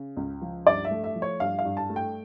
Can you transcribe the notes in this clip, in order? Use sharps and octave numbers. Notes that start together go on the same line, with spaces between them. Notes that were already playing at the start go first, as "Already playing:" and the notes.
Already playing: C#3
C#2
F3
G2 D5
E5
A3
E5
F3
C#5
G2 F5
F5
G2
A5
A3
G5